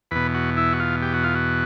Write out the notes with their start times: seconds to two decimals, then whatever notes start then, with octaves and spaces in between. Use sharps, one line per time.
0.11 E2 B2 B4
0.34 F#4
0.57 E4
0.73 F#4
0.80 F4
1.02 G4
1.14 F#4
1.24 F4
1.35 F#4